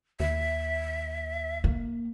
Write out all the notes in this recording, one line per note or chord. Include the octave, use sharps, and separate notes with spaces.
D#2 E5
A#3